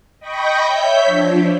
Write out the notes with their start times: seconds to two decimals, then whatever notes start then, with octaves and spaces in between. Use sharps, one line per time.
0.19 D#5 G5 B5 C#6 G6 A#6
0.63 C#5 E5 G6 B6
1.05 F3 D4